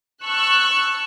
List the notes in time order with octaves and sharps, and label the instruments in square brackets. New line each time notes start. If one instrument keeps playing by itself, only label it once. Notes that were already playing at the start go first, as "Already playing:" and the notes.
[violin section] A5 C#6 E6 F#6